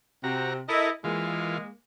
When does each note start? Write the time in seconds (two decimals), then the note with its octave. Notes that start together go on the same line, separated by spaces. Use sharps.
0.24 C3 C4 F#4 A#5
0.69 E4 A4 A#4 D#5
1.04 E3 G#3 A#3 F4